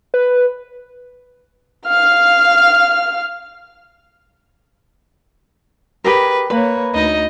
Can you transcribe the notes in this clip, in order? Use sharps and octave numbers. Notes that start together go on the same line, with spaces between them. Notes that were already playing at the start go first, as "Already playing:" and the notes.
B4
F5 F6
G4 G#4 A#4 B4
A#3 B4 C#5 B5
D2 D#4 D#5